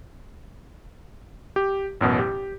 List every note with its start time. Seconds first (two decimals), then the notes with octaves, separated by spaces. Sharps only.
1.56 G4
2.01 A1 F#2 B2
2.19 G4